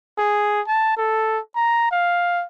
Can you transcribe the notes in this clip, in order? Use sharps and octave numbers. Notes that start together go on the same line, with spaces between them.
G#4
A5
A4
A#5
F5